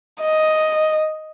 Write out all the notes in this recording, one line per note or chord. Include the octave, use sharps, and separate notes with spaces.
D#5